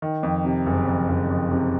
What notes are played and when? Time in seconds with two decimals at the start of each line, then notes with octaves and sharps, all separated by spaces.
0.02 D#3
0.23 F2
0.45 C3
0.66 F#1
0.88 F2
1.09 F#1
1.30 F2
1.51 C3